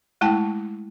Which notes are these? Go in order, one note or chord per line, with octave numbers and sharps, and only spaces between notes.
G#3 A3 E4 G5 A5